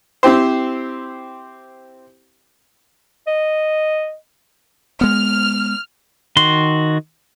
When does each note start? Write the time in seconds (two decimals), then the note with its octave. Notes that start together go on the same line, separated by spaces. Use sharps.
0.23 C4 E4 G4 C5
3.27 D#5
5.01 G#3 B3 F6
6.37 D#3 F#4 C6